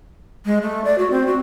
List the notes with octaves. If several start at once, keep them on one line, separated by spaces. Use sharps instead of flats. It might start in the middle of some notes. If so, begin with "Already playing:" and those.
G#3
A3
D5
F#4
C4
F#4